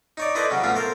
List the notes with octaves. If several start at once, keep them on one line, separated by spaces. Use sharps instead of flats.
D#4 C#5 D5
E4 A4 B4 C5 D5 D#5
C#3 F#3 C#4
F3 A3 B3 C#4 F4
A4 A#4 C5